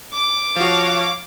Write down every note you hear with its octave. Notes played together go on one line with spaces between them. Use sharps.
D6
F3 F#4 C#5 F5